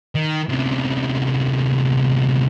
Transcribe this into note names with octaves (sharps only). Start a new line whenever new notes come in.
D#3
D2 C3